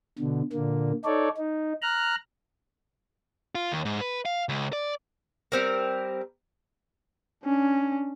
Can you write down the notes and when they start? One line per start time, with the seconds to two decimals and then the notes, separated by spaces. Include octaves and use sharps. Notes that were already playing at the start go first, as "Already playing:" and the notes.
0.19 B2 D3
0.53 A#2 D3 A#3
1.05 D#4 A4 C#5 D5
1.37 D#4
1.82 A#5 F6 F#6
3.55 F4
3.72 D#2
3.85 G#2
4.01 B4
4.25 F5
4.49 C#2
4.73 D5
5.52 G3 C4 A#4
7.44 C#4 D4